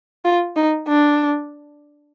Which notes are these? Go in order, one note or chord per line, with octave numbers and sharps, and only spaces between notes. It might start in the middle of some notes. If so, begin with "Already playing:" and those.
F4
D#4
D4